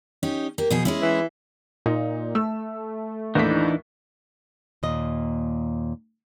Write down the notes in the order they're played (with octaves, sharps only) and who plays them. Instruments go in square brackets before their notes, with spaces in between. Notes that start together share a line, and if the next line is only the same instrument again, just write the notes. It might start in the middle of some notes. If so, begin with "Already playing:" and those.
[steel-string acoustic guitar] C#4 D#4 G4
A#3 G4
B2 F3 G#4
G#3 C#4 E4
[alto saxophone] E3
[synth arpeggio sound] A#2 [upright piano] D#4
[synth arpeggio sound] A3 [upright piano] E6
[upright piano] D#2 A2 B6 [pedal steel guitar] E3 D4 D#4
[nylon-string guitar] D#2 A#2 D#5